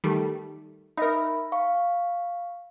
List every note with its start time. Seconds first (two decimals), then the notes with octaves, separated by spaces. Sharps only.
0.04 D#3 G3 A3
0.97 D#4 A#4 E5 B5
1.52 F5 C#6